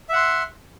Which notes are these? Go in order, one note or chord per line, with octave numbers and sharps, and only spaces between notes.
E5 F#5 C6